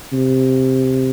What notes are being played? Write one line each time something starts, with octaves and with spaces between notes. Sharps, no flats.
C3